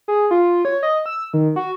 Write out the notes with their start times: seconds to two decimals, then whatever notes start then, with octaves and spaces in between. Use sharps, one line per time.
0.08 G#4
0.31 F4
0.65 C#5
0.83 D#5
1.06 E6
1.33 D#3
1.56 F#4